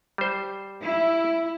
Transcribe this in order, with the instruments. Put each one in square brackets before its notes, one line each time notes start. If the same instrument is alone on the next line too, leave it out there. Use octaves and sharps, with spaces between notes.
[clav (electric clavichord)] G3 C5
[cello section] E4